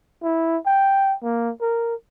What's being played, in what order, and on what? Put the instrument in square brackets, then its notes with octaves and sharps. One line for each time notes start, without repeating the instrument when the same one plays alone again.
[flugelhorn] E4
G5
A#3
A#4